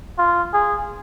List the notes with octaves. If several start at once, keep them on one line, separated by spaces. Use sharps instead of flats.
F4
G#4